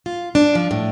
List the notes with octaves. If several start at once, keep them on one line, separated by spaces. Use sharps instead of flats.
F4
D4
F3
A2